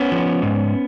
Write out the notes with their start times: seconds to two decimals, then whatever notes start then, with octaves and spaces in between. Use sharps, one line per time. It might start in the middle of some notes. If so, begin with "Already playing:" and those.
Already playing: B3 C#4
0.11 F3
0.42 G#2